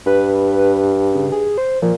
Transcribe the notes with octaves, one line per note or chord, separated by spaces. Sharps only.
G2 B4
C#3
G#4
C5
A#2 F3